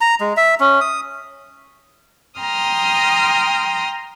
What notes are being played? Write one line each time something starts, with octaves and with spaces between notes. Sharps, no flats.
A#5
G#3
E5
C#4
D#6
G5 A#5 C6 D#6 F6